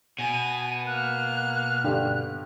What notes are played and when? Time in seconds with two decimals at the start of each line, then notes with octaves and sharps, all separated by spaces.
0.19 B2 G#5 D#7
0.86 A#3 F6 F#6
1.84 G2 D3 G4